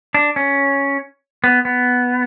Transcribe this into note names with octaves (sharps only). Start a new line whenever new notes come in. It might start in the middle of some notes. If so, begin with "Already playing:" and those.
D4
C#4
B3
B3